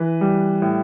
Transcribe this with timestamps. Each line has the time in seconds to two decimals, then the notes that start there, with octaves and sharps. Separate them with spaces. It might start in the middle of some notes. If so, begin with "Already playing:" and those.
Already playing: E3 B4
0.21 G3
0.62 A2